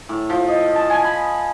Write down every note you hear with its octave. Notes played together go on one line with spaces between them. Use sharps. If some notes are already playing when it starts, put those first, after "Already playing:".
A2
F3
D#5
A5
G#5
B5